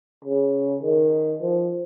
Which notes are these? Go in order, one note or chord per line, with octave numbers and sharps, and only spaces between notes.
C#3
D#3
F3